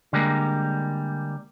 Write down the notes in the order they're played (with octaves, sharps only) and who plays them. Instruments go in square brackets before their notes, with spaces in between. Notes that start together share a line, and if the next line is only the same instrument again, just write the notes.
[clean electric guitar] D3 G3 G#3 A#3